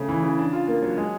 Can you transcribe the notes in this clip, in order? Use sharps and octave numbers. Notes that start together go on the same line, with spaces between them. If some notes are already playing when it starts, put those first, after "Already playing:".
Already playing: C#3 A3
E3
C#3
D4
F4
A#3
F#3
G#3